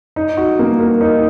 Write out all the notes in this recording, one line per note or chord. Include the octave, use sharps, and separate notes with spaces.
D#4
F#4
A#3
A#4
D#4